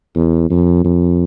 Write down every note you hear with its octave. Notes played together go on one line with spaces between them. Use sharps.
E2
F2
F2